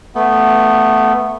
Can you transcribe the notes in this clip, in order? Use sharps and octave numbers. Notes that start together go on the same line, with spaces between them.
A3 B3